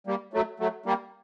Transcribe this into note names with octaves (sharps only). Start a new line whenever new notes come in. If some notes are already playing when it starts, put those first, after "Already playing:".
G3 A#3
F#3 A3
F#3 A3
G3 A#3